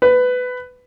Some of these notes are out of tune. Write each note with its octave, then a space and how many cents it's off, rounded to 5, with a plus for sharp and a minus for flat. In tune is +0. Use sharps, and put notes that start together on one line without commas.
B4 +15